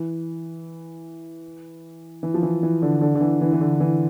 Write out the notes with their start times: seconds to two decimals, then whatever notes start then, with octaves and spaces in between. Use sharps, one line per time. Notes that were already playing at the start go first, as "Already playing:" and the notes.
Already playing: E3
2.23 E3
2.34 F3
2.43 E3
2.63 E3
2.82 D3
3.01 D3
3.15 D3
3.21 E3
3.41 E3
3.53 E3
3.61 D3
3.80 E3